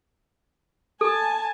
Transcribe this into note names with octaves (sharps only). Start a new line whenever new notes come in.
A4 G#5 A5